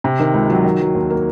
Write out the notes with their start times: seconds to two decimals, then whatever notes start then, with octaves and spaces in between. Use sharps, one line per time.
0.04 C3
0.20 D#3
0.34 C#2
0.50 F#3
0.64 D#3
0.80 F#3
0.95 D#2
1.10 A#3